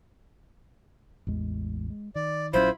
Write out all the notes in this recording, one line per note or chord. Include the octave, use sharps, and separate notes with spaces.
A1 E2 G#3
G#3
D#3 D5
A#1 F#3 C#4 E4 F4 C5 B5